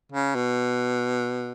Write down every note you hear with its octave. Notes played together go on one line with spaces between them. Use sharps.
C#3
B2